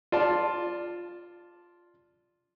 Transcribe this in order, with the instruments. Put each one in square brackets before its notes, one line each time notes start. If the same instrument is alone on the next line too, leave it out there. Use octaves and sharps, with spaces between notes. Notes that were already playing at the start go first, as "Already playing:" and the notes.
[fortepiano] F4 D5 A5